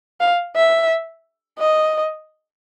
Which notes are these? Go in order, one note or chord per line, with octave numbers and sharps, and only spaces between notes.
F5
E5
D#5